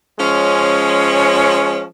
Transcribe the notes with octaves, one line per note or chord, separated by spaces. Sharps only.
F3 G#3 C#4